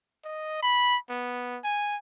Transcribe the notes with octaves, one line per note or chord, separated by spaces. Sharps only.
D#5
B5
B3
G#5